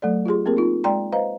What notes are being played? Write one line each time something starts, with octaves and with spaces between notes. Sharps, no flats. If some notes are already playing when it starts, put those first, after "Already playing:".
F#3 A3 A4 D5
F4 G4 G#4 C6
A#3 C4 G4 G#4 A#4
D#4 F4
G#3 D5 G5 A#5 C6
B4 C5 D#5 F5 A#5